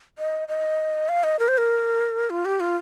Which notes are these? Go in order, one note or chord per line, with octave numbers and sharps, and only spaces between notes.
D#5
D#5
F5
D#5
A#4
C5
A#4
F4
G4
F4